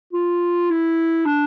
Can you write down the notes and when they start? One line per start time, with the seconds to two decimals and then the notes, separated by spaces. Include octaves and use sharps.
0.13 F4
0.70 E4
1.26 D4